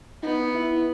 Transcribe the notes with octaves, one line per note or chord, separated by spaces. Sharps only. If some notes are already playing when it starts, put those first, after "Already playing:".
B3 D#4
E4